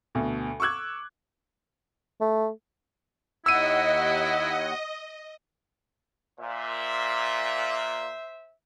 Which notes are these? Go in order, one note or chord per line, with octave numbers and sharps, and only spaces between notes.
D2 B2
C#6 D6 E6 F#6 G#6
A3
D#2 E4 D#5 F#5 E6 D#7
A#2 C5 E5